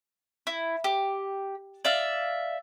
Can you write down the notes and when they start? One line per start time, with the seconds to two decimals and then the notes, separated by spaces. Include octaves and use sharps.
0.47 E4
0.84 G4
1.85 D5 E5 F5